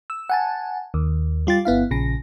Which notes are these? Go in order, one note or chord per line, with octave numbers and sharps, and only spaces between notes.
E6
F#5 G#5 A5
D#2
G3 F4 G4 A6
G1 B3 E4 F5
A#1 C#3 A#6